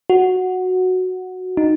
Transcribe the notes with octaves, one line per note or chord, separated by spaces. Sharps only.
F#4
D#4